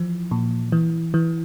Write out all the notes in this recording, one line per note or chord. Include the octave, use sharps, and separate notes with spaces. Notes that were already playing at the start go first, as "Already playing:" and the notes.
Already playing: E3 F3
A#2
E3
E3